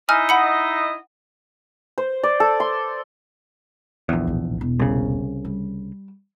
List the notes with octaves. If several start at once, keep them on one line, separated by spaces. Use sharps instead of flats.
D#4 E4 D#5 G#5 F6
F#5 B5 C#7
C5
D5
A4
C6
A#1 E2
B1 A2
E1
C2 C#3
G3